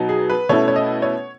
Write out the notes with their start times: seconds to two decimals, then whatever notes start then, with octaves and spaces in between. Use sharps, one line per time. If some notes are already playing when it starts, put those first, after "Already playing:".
Already playing: B2 F#3 B3 D#4
0.09 G#4
0.30 B4
0.49 B2 A3 C#4 E4 C#5
0.68 C#5
0.76 D#5
1.02 C#5